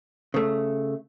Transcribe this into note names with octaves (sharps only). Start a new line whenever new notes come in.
C#3 A3